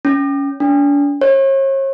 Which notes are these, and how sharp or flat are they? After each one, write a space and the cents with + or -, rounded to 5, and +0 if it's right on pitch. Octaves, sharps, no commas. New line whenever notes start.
C#4 +15
D4 -40
C#5 -40